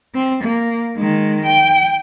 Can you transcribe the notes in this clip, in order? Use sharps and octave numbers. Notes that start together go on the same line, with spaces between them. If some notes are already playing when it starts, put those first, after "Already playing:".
C4
A#3
D#3 G#3
G5